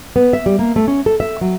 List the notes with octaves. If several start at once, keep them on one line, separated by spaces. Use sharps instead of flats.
B3
E5
G3
A#3
A3
C#4
A4
E5
F#3